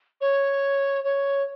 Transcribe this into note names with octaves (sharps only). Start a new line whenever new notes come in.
C#5
C#5